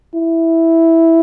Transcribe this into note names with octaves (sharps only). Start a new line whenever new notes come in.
E4